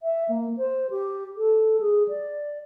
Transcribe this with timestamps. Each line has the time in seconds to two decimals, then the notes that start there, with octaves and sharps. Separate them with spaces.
0.03 E5
0.29 A#3
0.57 C5
0.90 G4
1.37 A4
1.80 G#4
2.08 D5